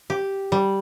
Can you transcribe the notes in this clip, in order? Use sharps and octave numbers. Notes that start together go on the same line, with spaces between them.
G4
G3